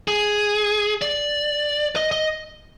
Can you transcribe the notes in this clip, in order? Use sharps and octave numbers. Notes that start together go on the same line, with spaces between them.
G#4
D5
D#5
D#5